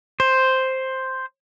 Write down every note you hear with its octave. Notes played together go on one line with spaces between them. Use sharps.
C5